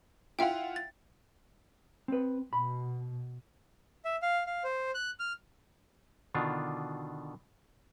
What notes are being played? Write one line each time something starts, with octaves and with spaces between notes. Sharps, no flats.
E4 F4 E5 F#5 G5
A6
C4 B4
B2 B5
E5
F5
F5
C5
F#6
F6
B2 D3 D#3 D4 F4